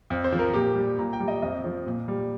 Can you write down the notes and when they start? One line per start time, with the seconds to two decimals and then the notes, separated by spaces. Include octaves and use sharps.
0.10 F2
0.24 C5
0.32 F3
0.39 A#4
0.54 A#2 G4
0.75 G3
0.99 A#2 A#5
1.13 G5
1.20 G3
1.28 D#5
1.42 F2 D#5
1.64 F3
1.86 A#2
2.08 G3